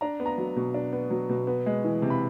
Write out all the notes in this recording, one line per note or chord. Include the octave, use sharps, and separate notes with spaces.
D4 A#5
B3
A#5
F#3
B2
D4
B3
F#3
B2
B3
G#3
E3
C3
B5